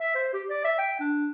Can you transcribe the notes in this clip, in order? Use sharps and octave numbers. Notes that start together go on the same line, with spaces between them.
E5
C5
G4
D5
E5
G5
D4